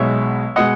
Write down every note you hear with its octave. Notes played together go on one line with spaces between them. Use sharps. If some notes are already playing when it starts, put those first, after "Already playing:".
Already playing: B1 B2 G#3 C#5 E5
B2 G#3 D#5 F#5